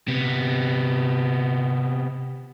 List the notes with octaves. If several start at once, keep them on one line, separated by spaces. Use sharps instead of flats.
C3 B3